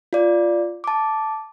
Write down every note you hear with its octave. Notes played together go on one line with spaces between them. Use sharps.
F4 D5
A5 D6